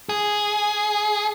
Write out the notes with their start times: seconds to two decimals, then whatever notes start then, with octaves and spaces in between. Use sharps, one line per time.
0.09 G#4